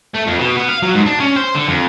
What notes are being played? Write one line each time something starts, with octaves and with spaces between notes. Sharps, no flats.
A3
F2
B2
B3
F5
F#3
G#2
D4
C#4
C5
D3
F2